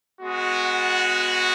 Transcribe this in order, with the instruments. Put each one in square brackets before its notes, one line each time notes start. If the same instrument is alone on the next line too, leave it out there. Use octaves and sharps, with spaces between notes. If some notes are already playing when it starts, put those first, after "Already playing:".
[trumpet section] G#3 B3 F#4